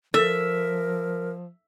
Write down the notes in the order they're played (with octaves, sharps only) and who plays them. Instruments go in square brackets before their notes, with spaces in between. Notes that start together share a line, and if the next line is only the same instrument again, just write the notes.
[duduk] F3 [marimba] A4 [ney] A#4 [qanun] E5